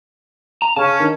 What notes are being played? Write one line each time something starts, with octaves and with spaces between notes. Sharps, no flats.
A#5
C#3 C#4 A5
D#3